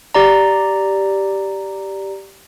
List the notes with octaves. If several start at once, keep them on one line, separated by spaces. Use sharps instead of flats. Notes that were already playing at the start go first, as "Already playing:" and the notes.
G4 D5 A#5